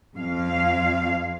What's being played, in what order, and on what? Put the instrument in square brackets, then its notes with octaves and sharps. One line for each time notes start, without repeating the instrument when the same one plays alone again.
[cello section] F2 F5